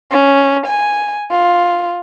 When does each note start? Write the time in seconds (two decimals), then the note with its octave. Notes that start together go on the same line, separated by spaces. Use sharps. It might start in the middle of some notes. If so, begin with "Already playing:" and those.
0.11 C#4
0.66 G#5
1.31 F4